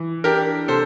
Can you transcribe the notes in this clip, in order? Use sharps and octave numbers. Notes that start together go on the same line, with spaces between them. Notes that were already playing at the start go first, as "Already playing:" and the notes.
Already playing: E3
D4 G4 A#4
C3 A4 C5